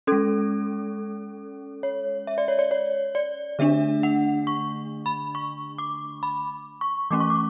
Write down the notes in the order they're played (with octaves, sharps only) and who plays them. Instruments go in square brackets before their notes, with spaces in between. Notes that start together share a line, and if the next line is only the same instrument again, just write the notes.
[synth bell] G#3 C#4 A4
C#5
E5
D5
C#5
D5
C#5
D5
D3 A3 D4 E5
F#5
C#6
B5
C#6
D6
B5
C#6
E3 A3 C#4 D6
C#6
D6